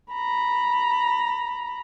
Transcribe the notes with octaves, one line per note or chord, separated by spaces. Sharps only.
A#5 B5